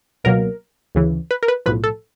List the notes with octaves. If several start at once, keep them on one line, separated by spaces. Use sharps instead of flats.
C#2 B2 F#3 A#3 A#4
D2 C#3 E3
B4
A#4
B4
B1 A2 F3 B4
A4